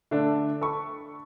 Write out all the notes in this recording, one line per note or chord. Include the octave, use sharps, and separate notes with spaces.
D3 A3 D4
A4 B5 C#6